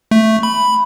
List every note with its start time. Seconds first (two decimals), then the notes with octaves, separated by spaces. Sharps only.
0.11 A3
0.43 B5